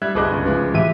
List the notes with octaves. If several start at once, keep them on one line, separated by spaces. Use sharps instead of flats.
G3 E5 F#6 G#6
G1 C2 G#4 D#5 D6 F#6
C#2 B4
F3 G#3
A2 E3 G4 E5 D#7